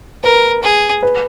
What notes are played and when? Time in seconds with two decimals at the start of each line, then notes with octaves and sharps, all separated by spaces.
0.24 A#4 B4
0.63 G#4
1.03 B4